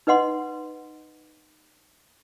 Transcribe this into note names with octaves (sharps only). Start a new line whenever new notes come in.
D#4 B4 D#5 F#5 C6